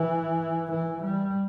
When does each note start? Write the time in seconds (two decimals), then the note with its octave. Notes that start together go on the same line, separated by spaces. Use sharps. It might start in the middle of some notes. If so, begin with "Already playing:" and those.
Already playing: E3
0.71 E3
1.02 G3